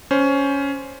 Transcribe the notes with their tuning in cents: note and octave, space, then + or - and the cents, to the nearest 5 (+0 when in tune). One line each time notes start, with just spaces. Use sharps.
C#4 +10 C5 +5